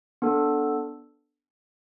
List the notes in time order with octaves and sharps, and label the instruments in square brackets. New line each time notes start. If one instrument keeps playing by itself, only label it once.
[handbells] B3 D4 A4